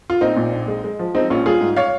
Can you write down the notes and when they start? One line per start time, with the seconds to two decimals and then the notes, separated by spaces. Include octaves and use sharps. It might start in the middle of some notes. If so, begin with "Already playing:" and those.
0.10 F4
0.21 A#1 C4 D#4
0.36 A#2
0.52 A#1
0.68 G#3
0.84 G#3
0.99 F3
1.14 G#3 C4 D#4
1.30 A#1 C#4 F4
1.46 G3 F4 G#4
1.61 G#2
1.76 C#5 F5